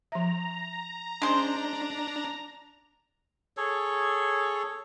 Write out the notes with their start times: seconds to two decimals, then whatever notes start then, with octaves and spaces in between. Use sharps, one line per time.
0.12 F3 E5 A#5
1.22 G#3 C#4 D4 C5
3.57 G#4 A4 C#5